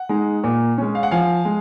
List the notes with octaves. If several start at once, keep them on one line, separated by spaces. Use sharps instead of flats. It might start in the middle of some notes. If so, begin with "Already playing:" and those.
Already playing: F#5
G#3 D#4
A#2
G#3 C#4
F5
F#5
F3 F5 G#5
G#3